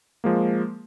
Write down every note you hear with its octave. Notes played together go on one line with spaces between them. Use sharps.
F3 G#3 A#3